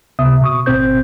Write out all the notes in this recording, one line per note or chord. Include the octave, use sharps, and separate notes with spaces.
C#2 C3 B3 E5 D#6
B2 C#6 D#6
G#1 B2 C4 C5 G6